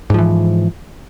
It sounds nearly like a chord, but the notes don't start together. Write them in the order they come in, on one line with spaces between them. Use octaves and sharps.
G#2 F3 E3